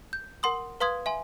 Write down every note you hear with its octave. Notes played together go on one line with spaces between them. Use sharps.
G6
A#4 F#5 C6 D#6
B4 F5 C6 D#6 G#6
E5 G#5 C6